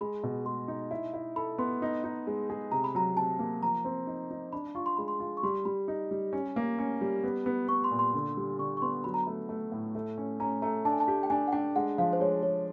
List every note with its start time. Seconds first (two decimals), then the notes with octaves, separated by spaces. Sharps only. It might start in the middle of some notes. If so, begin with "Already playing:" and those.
0.01 G#3 B5
0.23 B2
0.46 G#3 C6
0.68 D#4
0.91 E4
1.14 E4
1.36 A4 B5
1.58 B3 C6
1.82 D#4
2.04 D#4
2.27 G#3
2.50 G#4
2.72 C3 A#5
2.84 B5
2.95 F#3 A#5
3.17 C3 A5
3.39 A#3
3.63 F3 A#5
3.85 C4
4.07 D#4
4.31 D#4
4.53 D4 B5
4.75 F4 C#6
4.86 C6
4.97 G#3 B5
5.08 C6
5.20 F4
5.37 C#6
5.43 G3 C6
5.65 G3 B5
5.88 D#4
6.11 G3
6.33 C#4
6.56 A#3
6.79 C#4
7.01 G3
7.24 B3
7.46 B3
7.68 B3 C#6
7.84 C6
7.91 A#2
7.99 C6
8.14 D3
8.37 G3
8.59 D3 C#6
8.77 C#6
8.82 B3 C6
9.04 F#3 B5
9.14 A#5
9.23 A3 B5
9.49 A3
9.72 A2
9.95 A3
10.18 C#4
10.40 C#4 A#5
10.62 A3 A#5
10.85 D4 A5
10.93 G#5
11.00 A5
11.08 G4
11.23 G5
11.30 D4 G#5
11.48 F#5
11.52 D4 G5
11.76 G#3 F#5
11.98 F3 F5
12.13 C5
12.20 G#3 C#5
12.43 G#3 C#5